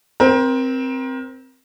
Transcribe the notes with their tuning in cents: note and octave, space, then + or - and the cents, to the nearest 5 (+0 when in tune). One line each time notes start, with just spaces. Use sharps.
C4 +0 A#4 +30